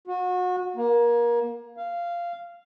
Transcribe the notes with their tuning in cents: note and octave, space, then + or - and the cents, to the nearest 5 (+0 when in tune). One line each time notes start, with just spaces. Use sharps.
F#4 -30
A#3 +25
F5 -10